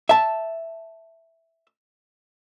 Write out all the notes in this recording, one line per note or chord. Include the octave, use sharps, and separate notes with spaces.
E5 A5